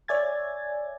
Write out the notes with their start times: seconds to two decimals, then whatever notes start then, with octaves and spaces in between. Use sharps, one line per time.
0.08 C#5 D5 E5 G#5 G#6 A6